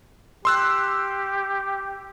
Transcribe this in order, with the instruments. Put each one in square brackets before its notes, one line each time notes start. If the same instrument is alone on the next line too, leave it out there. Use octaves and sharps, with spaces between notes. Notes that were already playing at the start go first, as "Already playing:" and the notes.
[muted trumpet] G4 [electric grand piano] C6 E6 F#6